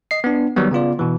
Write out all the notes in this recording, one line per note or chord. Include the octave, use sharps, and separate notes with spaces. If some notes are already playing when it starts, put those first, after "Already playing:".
D#5 C7
B3 D4
D#3 F#3 G3 B3
C#3 B3 F4 D5
B2 E3